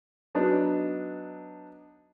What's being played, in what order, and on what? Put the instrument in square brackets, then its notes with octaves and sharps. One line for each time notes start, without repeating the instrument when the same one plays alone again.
[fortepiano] F#3 B3 D4 D#4